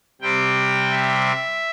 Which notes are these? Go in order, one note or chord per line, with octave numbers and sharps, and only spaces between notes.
C3 G3 C4 G5
E5